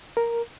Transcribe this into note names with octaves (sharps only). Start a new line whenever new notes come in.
A#4